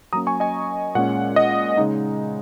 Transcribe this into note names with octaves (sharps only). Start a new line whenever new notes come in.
F#3 A#3 C#4 A#5 D#6
G#5 C#6
D#5 G#5
A#2 G#3 C#4 F#5
D#5
C#3 G#3 D#4